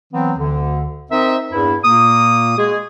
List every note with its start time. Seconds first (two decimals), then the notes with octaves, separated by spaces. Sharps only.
0.14 E3 F#3 B3 C4
0.38 D2 D3
1.11 C4 D#4 A#4 C5 D#5 E5
1.52 E2 G2 E4
1.84 A#2 A#3 D#6
2.58 G#3 F#4 G#4